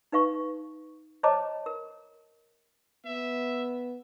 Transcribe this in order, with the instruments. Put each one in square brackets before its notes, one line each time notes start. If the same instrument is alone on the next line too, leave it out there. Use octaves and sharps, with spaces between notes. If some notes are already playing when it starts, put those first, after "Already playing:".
[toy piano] D#4 B4 F5 C#6
C5 C#5 D#5 A5 A#5 D6
A#4
[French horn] B3 [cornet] E5